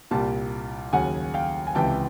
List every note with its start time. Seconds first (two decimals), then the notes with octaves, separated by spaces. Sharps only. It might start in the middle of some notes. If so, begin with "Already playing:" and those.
0.11 C2 A#2 G3 G5 A5
0.93 D#2 C#3 F#3 F#5 G#5
1.34 F5 G5
1.67 G#5
1.75 C#2 C3 E3 G5 A5